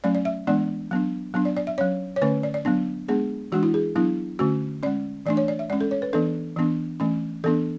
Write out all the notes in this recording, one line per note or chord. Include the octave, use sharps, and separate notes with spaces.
F#3 A3 C#4 D5
D5
E5
E3 G#3 B3 D4 D5
F#3 B3 D4
F#3 B3 D4
D5
D5
E5
F#3 C#4 C#5
C#5
D3 A3 C#4 B4
D5
D5
F#3 B3 D4
G#3 B3 D4 G#4
E3 G#3 D4 F#4
E4
G#4
F#3 B3 D4 E4
D3 A3 C#4 F#4
G#3 C#4 D5
E3 A3 D4 D5
C#5
D5
E5
G#3 C#4 D5
A4
C#5
B4
E3 B3 D4 A4
E3 B3 D4
E3 A3 C#4
E3 B3 D4 A4